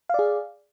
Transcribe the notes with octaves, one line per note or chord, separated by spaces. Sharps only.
G#4 D5 F5